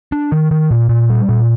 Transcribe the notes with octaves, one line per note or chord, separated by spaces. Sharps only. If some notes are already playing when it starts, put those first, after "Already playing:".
D4
D#3
D#3
A#2
A#2
G3
A#2